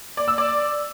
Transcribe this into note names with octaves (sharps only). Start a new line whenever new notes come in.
D5
E6
D5